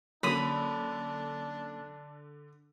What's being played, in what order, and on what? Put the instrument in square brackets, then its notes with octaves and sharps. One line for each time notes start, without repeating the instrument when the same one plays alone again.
[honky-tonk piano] D3 [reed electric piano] F#3 A#3 C#4 [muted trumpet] D4 [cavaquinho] B5 D#6